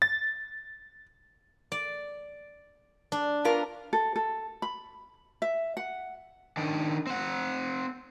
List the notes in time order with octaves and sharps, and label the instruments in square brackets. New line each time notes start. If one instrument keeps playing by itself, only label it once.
[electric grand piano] A6
[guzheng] D5
D4
[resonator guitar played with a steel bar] B3 F4 A#4
[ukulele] A4
A4
B5
E5
F#5
[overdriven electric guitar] D#3 D4
C4 F#5